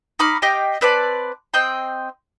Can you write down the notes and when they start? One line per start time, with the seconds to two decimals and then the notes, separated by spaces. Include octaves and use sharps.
0.19 D#4 B5 D6 F6
0.42 G4 D#5 F5 G5
0.81 C4 B4 D5 A5
1.54 C4 D#5 G5 C6